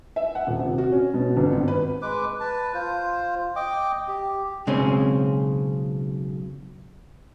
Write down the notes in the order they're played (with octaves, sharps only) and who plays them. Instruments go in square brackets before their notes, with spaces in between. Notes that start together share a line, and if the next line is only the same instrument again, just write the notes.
[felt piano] E5
F#5
D#1
C3
F#4
C#4
B2
G1
G#1
B4
[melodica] G#3 B4 D6
B4 A5
F4 C5
D#5 G5 D6
G4
[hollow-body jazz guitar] B1 C#3 G#3 C4 C#4